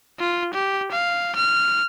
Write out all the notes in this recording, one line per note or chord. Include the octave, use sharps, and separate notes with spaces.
F4
G4
F5
F6